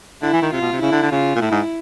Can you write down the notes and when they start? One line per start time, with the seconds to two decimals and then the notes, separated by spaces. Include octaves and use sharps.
0.22 D3 E4
0.33 E3
0.42 D#3
0.52 C3 F4
0.62 B2
0.72 C3
0.82 C#3 E4
0.92 D3
1.03 D3
1.11 C#3 F4
1.36 A#2
1.41 A2 E4
1.52 G#2